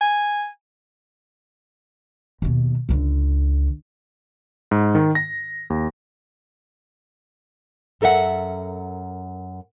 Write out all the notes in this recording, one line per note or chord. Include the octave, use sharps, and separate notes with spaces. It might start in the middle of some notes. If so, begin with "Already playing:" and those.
G#5
D#2 B2
C#2 D3
G#2
D#3
A#6
D#2
F#2 A4 A#4 E5 F#5